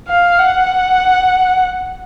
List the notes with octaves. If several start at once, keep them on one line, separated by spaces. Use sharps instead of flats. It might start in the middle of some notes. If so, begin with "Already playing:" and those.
F5
F#5